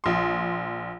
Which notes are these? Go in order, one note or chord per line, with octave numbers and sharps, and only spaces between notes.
A#1 C6